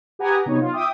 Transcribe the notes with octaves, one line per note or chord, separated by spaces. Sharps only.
G4 B4 F#5 G#5 A#5 D#6
C3 F#3 B3 D#4 C#5
F4
E5 G5 D6 D#6